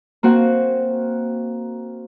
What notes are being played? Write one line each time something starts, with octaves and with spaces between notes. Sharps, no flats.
A#3 C4 F#4